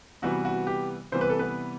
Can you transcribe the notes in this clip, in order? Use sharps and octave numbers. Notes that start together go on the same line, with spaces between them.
C3 E3 G3 B3 F#4
F#4
G4
C3 E3 G3 B3 C5
B4
A4
B3 B4